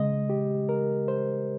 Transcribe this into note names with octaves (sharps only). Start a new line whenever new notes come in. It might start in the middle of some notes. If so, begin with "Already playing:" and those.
Already playing: C#3 G#3 D#5
G4
A#4
C5